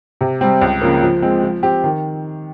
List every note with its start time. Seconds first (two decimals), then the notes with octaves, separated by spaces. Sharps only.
0.21 C3
0.41 G3 C4
0.61 C#2
0.82 C#3 F3 A#3
1.03 F3
1.22 G#3 C4
1.43 F3
1.63 C4 G4
1.84 D#3